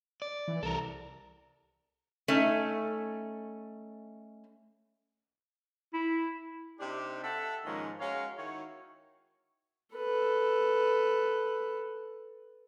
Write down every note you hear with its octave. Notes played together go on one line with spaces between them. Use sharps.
D5
E3
C2 A4 A#4
A3 C#4 D#4
E4
C3 D4 D#4 G4
A4 E5 F#5 G5 A5
G#2 D#3 F3 G#3 A#3 C#4
G#3 C#4 F#4 A#4 C#5 F5
D#3 E4 F#4 C#5
A4 B4